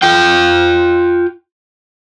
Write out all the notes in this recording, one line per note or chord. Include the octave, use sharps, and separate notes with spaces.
F4 G5